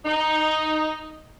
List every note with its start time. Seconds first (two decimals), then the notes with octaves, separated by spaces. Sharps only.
0.05 D#4